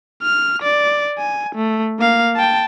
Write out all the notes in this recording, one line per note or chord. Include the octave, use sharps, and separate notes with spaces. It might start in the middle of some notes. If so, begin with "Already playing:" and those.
F6
D5
G#5
A3
A#3 F5
G5 A5